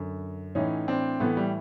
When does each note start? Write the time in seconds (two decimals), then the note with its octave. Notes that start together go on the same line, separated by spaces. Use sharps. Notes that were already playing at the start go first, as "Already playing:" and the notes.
Already playing: F#2 D3
0.55 A2 E3 C#4 D#4
0.88 C4 D4
1.20 A2 E3 A3 B3
1.37 G3